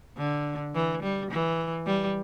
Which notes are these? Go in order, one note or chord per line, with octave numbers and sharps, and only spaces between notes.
D3
E3
G3
E3
G3